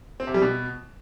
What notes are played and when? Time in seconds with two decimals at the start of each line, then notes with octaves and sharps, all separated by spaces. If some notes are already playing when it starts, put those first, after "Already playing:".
0.20 C4
0.27 C3
0.34 G3
0.42 B2